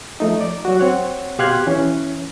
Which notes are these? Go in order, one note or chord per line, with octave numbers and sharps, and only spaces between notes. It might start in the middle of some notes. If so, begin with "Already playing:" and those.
F3 A3 D#4
D5
F#3 F#4
C4 C#5 F#5
B2 G4 F5 C6 F#6 G#6
E3 C#4